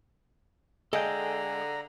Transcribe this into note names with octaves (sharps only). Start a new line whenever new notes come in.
D3 G#3 A4 F5 G5 A#5